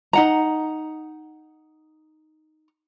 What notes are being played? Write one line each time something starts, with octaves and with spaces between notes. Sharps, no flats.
D#4 F#5 A#5